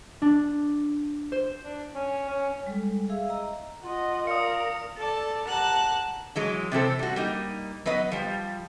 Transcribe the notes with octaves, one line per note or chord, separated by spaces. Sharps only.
D4
C5
D4
C#4
C#4
G3 G#3 A4
G#4 E5 F5 E6
D#5 A#5
F4 D#5 F#5
A#4 D5 F5 A#5 D#6 C#7
A4 D5 A5
G4 A#4 F#5 A5 F#6
E3 F#3 G#3
C3 E3 C4 A4
G3 F#4
G3 A#3 D#4
F#3 B3 B4 D#5
F3 G3